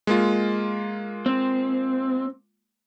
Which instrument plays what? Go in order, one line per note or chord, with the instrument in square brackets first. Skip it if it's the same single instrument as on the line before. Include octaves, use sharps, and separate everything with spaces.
[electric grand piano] G#3 A#3 F4
[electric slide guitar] C4